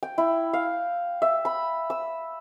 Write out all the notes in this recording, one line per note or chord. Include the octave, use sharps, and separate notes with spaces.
G5
E4
F5
E5
B5
E6